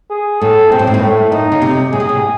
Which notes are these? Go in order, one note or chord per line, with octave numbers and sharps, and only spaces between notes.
G#4
A2 A4
C3 C4
A2
G#2
A2
A3
A2 D#4
C#3
C3
A2 G#4
C3
A2